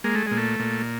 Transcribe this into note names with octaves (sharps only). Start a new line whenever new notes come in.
G#3 A#3
A3
A#2 G#3
A3
A#2